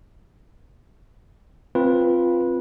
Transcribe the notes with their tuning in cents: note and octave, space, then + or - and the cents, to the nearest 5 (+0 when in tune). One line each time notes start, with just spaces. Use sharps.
C4 +0 F4 +0 B4 -15